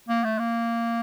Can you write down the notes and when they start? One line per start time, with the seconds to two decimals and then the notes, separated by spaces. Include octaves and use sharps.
0.09 A#3
0.24 A3
0.39 A#3